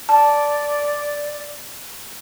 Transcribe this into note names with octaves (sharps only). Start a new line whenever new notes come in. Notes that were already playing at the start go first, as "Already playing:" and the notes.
D5 A5